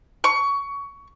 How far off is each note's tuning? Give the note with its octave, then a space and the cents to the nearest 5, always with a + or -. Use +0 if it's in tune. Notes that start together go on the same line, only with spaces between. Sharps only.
C#6 +20